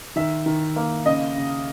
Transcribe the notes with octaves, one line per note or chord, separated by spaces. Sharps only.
D#3 E5
D#3
A#3
C#3 D#5
C#3